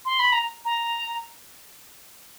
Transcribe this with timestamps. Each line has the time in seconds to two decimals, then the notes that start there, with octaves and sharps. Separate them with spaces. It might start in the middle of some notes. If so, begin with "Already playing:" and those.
0.05 C6
0.19 B5
0.32 A#5
0.65 A#5